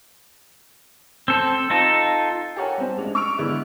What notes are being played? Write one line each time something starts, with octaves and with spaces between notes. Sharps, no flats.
C4 A4
D#4 F4 A4
G4 A4 A#4 C#5 F#5 G#5
G3 C4
A1 G#3 D4 F7
C#6 E6 F6 D7 F7
D3 G#3 B3 E4